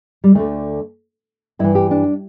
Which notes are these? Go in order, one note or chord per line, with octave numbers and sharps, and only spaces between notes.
G3
D2 D3 A3
G2 E3 E4
G4
D4